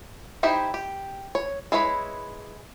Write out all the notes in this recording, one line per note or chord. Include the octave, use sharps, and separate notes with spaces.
D#4 E4 G4 C5 E5
G4
C#5
G#3 E4 B4 C#5 B5